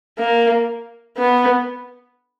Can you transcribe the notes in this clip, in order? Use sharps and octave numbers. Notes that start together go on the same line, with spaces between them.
A#3
B3